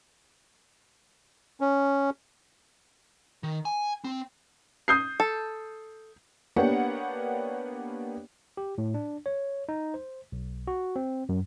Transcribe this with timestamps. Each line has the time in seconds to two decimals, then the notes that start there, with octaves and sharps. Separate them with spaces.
1.61 C#4
3.43 D#3
3.65 G#5
4.04 C4
4.88 D#6 G6 C7
5.20 A4
6.56 A#3 B3 D4 G4 C#5 F#5
8.57 G4
8.78 A2
8.94 D4
9.26 C#5
9.69 D#4
9.94 C5
10.32 B1
10.68 F#4
10.96 C4
11.29 F#2